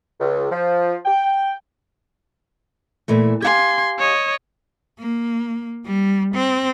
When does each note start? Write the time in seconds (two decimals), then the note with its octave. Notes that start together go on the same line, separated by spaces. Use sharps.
0.20 C#2
0.50 F3
1.06 G5
3.08 A#2 E3 A3
3.42 G4 F5 G#5 C6 G#6
3.99 C#5 D#5
4.99 A#3
5.85 G3
6.34 C4